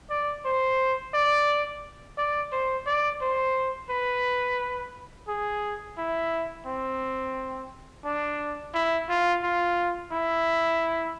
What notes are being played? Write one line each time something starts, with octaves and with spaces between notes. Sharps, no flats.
D5
C5
D5
D5
C5
D5
C5
B4
G#4
E4
C4
D4
E4
F4
F4
E4